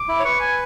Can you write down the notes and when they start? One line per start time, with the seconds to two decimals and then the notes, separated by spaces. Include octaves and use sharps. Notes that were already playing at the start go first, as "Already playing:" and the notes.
Already playing: D6
0.09 E4
0.20 C#5
0.24 B4 C#6
0.40 G#5